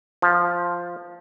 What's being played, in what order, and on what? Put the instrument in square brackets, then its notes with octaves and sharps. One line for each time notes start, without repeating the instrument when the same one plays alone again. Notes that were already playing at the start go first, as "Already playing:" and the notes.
[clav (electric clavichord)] F3